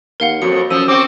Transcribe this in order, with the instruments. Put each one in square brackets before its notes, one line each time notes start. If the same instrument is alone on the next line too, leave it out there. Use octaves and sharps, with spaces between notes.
[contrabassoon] D#2 [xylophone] A#4 F5 F#5
[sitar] F2 [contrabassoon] F#3 [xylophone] C#7
[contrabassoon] F#2 [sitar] F3 [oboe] E6 [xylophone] D#7
[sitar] C4 F#4 [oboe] D6